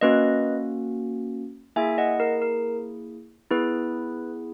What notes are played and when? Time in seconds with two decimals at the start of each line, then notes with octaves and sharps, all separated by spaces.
0.01 A#3 C#4 F#4 B4 D#5
1.76 A#3 E4 G#4 E5 G#5
1.98 D#5 F#5
2.20 A#4
2.42 A#4
3.51 B3 E4 G#4 B4